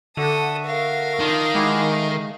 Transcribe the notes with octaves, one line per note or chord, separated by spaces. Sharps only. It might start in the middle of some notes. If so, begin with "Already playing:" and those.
D3 F#4 A4 E5 D#6
A#4 F5
D#3 D4 F4
G#3 E4 F#4 G4
A3